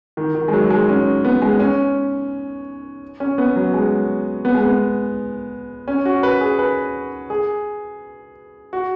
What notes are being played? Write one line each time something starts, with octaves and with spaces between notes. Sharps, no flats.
D#3
D#3
G#3
F#3
G#3
C#4
B3
G#3
C#4
C#4
B3
F#3
G#3
B3
G#3
B3
C#4
F#4
B4
G#4
B4
G#4
F#4